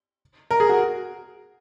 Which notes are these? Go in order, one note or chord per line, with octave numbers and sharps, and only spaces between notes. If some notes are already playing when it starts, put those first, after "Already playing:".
A#4
G#4
F#4